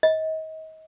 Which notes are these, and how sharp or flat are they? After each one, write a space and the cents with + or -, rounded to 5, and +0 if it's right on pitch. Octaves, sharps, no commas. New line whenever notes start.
D#5 +35